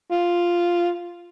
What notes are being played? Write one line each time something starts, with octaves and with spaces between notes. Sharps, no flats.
F4